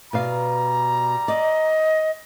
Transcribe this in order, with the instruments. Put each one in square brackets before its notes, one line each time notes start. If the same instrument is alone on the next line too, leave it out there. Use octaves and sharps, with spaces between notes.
[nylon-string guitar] B2 D5 F5 [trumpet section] G3 A#5
[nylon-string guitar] D5 [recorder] D#5